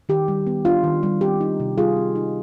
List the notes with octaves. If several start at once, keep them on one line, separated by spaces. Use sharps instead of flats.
D#3 G4
G3
B3
D4 F4
D#3
G3
C4 G4
D#4
C3
G3 F4 G#4
C4
D#4